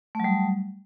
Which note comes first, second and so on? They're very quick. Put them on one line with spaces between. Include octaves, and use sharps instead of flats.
A3 F#3 G3